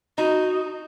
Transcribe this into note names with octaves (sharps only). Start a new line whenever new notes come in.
D#4 F#4